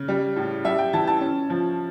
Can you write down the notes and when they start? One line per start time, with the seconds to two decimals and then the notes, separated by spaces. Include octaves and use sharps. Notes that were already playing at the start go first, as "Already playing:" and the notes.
Already playing: C#3
0.08 G3
0.36 A2
0.64 G3 E5
0.78 G5
0.93 E3 A5
1.07 A5
1.21 C#4
1.50 F3